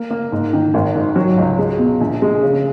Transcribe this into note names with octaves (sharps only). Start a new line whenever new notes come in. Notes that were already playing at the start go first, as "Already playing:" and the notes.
Already playing: A#3
A#3
G#2
D#3
G#1
G#2
F#3
C#2
G#3
B2
A#1
G#3
C#3